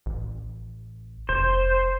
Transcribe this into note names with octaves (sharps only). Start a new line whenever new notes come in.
A1
F1 C5